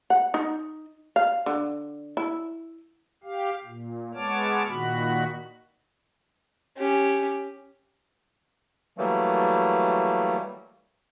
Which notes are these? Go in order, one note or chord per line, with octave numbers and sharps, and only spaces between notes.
F#5
D#4
F5
D3
E4
G4 F5
A#2
G#3 B3 C#5 A5 D6 F6
A#2 D#3 F#4 B5
C#4 G4
E3 F#3 G3 A3 A#3